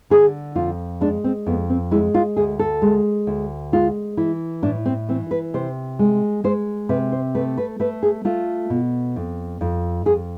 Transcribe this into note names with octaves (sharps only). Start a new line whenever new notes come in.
D3 G#4
F2 F4
G#3 D4
C4
F2 B3
C4
G#3 E4
F4
D2 G#4
A4
G#3
D2
G#3 F4
E3 E4
A2 D4
C4
E3 C4
B4
C3 C5
G#3
G#3 C5
C3 B4
C5
A3 B4
B4
A3 B4
G#4
A3 F4
B2
F2
F2
F2 G#4